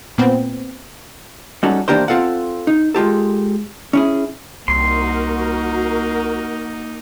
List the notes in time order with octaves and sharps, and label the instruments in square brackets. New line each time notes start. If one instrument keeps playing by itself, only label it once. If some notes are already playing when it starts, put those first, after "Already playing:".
[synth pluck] A#2 B3 C4
[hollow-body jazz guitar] G3 C#4 D#4 F#4 A4
E3 A#3 D4 G4 A#4 C5
C4 F4 A4 F5 F#5
D#4
G#3 F4 G4 A4
C#4 E4 G#4
[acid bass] C2 [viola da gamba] A#3 D#4 [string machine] F#4 A#4 [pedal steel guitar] C6